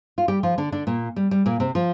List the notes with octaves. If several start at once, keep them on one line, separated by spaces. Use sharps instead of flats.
F4
G3 G4
F3 F4
D3 D4
D3 D4
A#2 A#3
G3
G3
A#2 A#3
C3 C4
F3 F4